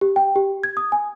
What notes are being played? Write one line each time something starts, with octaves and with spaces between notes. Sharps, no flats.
G4
G5
G4
G#6
D#6
G#5